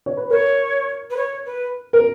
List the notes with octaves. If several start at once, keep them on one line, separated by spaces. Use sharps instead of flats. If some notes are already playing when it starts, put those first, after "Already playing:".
C#5
B4
A#4 C#5
B4
C#5
B4
A#4